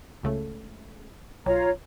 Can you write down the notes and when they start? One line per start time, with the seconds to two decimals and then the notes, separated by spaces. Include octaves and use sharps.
0.23 C#2 C#3 A3
1.46 B1 F4 C#5 A#5